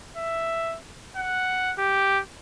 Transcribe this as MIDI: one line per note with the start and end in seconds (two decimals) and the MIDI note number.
0.17 0.77 76
1.17 1.72 78
1.79 2.20 67